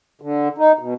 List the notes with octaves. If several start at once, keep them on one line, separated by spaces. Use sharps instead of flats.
D3
D#4
B2